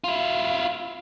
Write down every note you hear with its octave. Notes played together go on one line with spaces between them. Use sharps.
E4 F4